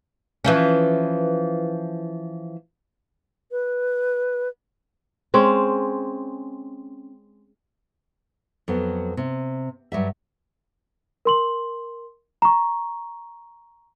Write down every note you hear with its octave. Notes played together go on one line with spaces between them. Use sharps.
E3 F3 C#4
B4
G#3 C4 C#4
F2 F#3 B3
C3
G2 F#3 G3 E5
A#4 C6 F#7
A#5 C#6